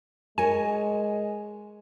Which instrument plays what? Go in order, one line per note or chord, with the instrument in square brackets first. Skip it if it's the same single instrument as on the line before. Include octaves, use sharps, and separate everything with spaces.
[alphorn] G#3 [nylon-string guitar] A#4 C#5 [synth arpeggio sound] G#5